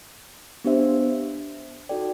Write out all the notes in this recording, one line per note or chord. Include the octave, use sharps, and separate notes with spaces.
B3 D4 G4 C5 E5
D#4 F#4 A4 D5 G5